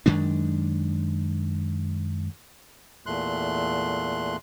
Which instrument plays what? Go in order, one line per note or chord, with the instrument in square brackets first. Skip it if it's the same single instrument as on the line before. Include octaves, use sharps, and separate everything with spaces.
[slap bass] F#2 D#3 G#3 D4
[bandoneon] E2 A#2 A3 C6 F#6